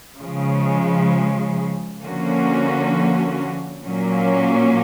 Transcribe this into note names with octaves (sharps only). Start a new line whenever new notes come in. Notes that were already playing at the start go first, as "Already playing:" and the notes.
C#3 F3 G#3
D3 F3 A#3 C#4 F#4
A#2 F#3 A#3 C#4